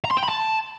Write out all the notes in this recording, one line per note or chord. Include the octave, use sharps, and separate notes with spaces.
A#5
C6
G5
B5
A5